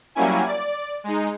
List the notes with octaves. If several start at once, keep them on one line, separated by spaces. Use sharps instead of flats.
F#3 G3 A#3 C#4 E4 G#5
D5
G#3 D#4